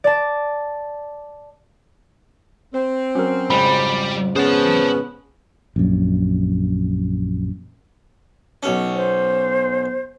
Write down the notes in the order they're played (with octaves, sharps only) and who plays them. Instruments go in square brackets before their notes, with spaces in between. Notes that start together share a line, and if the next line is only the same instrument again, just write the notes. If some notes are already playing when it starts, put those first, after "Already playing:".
[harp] D5 A5
[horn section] C4 [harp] C5
[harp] F#3 [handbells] C#4 A#4
[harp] F2 G#2 C#3 [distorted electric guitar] G3 [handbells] B5
[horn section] B3 C#4 [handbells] G#4 [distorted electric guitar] C5 A5
[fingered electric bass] A#1 F#2
[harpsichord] B1 C#4
[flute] C5